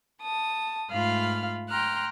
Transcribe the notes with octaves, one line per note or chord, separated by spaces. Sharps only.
A5 D#6
G#2 A3 F4 F5 B5 F6
G5 A#5 C6 F6 F#6